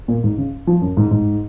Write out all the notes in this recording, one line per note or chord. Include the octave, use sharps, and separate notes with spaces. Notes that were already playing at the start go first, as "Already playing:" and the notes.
A#2
G#2
C#3
F3
F#2
G#2
G#2